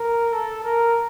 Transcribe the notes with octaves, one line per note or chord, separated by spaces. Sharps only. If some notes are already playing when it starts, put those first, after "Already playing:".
Already playing: A#4
A4
A#4